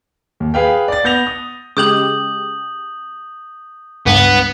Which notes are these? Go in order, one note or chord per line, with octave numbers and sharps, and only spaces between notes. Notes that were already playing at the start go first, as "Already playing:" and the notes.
D#2
G#4 B4 F5 G5
D5 A6
B3 G6 A#6 F7
D#6
C#3 G#3 G4 D#6 G6 F#7
C#2 G2 B3